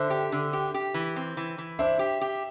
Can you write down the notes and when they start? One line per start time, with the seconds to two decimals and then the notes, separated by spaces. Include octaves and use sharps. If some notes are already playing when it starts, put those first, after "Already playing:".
Already playing: D3 A4 C5 E5
0.10 G4
0.32 D3
0.53 G4
0.74 G4
0.94 E3
1.16 C4
1.37 E3
1.58 E3
1.79 D4 C5 E5
1.99 G4
2.21 G4